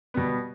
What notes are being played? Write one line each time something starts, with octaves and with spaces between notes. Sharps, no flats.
B2 G3 B3